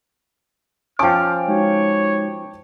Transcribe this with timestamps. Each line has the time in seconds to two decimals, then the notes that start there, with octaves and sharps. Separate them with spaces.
0.99 F3 C#4 G5 A5 D6 F6
1.48 G#3 D#4 F#4 C#5